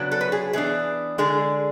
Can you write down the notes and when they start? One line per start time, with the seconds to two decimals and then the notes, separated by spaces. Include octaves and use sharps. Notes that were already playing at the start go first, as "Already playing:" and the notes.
Already playing: C#3 F#3 B3 D4
0.11 A4
0.21 B4
0.32 G#4
0.53 E3 B3 D4 G#4
1.18 D3 G#3 D4 G#4